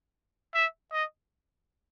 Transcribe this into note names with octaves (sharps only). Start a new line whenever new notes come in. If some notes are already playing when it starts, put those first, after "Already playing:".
E5
D#5